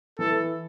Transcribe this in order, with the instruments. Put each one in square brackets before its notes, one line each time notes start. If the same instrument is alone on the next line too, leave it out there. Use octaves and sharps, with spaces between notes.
[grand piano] E3 [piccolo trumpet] A4